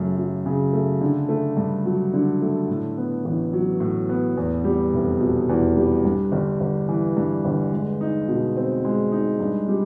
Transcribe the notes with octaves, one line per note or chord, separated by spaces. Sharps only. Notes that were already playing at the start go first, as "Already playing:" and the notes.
Already playing: F#2 C#3 A3
F#3
C#3
A3
D3
A3
G2
F#3
D3
A3
A2
B3
A1
F#3
A2
B3
E2
G3
F1
B2
E2
G3
G2
G1
G1
E3
G2
G1
G#3
D#4
B2
C4
G#3
D#4
G2
G3